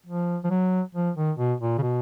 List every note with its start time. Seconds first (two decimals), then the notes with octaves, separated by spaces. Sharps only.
0.06 F3
0.44 F3
0.51 F#3
0.95 F3
1.16 D#3
1.38 B2
1.61 A#2
1.78 C#3
1.82 B2